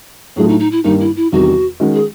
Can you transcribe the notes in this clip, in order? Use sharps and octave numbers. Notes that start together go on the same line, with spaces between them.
A2 F#3 A3 D4 F4 G#4
D#4
D#4
E4
G2 D#3 G3 A#3 D#4
E4
E4
E2 C3 D#3 G3 F#4
D#3 G#3 C#4 F#4
G#4